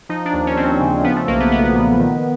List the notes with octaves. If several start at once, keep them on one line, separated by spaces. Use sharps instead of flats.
F3 D#4
D4
D#2
C#4
D#2 C4
C#3
F3 B3
A3
B1 A#3
B3
B1 B3
A#2
D#3